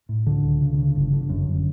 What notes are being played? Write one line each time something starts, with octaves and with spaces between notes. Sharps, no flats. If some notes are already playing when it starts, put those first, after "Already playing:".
A2
C#2 D3
C#2
C#3
C#3
G1
D3
F#2
G1